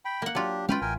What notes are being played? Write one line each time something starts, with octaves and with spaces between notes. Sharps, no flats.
G5 B5
A#3 F#5
F#3 D4 F4 G4
G#3 C#4 F4 B4 F5 G5
A1 A#4 G5 G#5